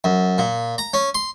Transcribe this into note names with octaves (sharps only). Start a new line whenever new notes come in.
F#2
A#2
A#5
C#4
C6